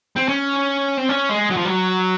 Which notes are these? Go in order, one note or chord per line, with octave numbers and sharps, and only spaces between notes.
C4
C#4
C4
C#4
G#3
F#3
F3
F#3